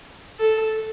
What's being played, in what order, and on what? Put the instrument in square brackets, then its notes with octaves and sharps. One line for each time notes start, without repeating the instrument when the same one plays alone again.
[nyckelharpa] A4